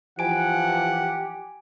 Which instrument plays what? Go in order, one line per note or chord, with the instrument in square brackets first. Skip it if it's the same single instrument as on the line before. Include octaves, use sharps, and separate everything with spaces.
[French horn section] E3 F3 [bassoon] G4 [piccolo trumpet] F#5 [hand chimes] G#5 D7